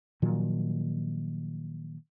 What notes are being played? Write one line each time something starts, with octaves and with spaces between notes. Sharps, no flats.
A#2 D#3 F3 F#3